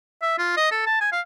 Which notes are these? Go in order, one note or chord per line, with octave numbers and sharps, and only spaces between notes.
E5
F4
D#5
A4
A5
G#5
F5